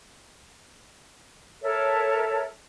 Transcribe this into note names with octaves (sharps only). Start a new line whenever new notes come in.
A4 A#4 C#5 E5